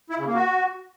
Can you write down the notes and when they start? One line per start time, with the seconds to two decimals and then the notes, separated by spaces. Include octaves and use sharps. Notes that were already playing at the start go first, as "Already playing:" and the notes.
0.10 E4
0.18 C#3
0.26 A#3
0.35 F#4